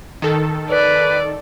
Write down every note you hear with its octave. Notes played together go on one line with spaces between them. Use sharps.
D#3 A4
B4 D5